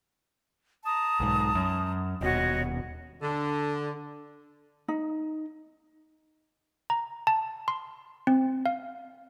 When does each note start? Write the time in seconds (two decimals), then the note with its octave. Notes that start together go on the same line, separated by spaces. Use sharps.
0.84 A5 A#5 D#6
1.20 B1 G#2
1.55 F#2
2.21 D#1 B2 F#4 C#5 D#5
3.22 D3
4.88 D#4
6.90 A#5
7.27 A5
7.68 C6
8.27 C4
8.66 F5